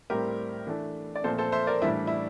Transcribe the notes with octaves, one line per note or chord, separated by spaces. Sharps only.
A2 G3 C4 G4 A#4
E3 A3 D4
D5
A#2 F3 A3 C4 A4 C5
A4 C5
C5 E5
A#4 D5
A2 E3 G3 D4 E4
E4